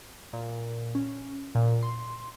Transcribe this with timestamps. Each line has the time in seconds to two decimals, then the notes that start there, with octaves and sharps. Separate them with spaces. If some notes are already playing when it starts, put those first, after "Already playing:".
0.33 A#2
0.95 C#4
1.55 A#2
1.83 C6